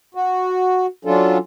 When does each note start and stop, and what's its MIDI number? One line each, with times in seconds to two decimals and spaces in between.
0.15 0.86 66
1.05 1.38 54
1.05 1.38 61
1.05 1.38 62
1.05 1.38 65
1.05 1.38 69